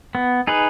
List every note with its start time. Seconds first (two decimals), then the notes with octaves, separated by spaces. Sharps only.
0.15 B3
0.47 D#4 G#4 B4